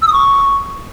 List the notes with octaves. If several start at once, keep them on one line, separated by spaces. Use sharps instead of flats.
E6
D#6
C#6